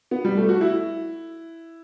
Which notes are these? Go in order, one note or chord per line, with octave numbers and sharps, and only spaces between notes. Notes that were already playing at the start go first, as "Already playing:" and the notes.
B3
G3
A3
F#4
E4